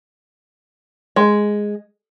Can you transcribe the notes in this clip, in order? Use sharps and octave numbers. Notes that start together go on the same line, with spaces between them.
G#3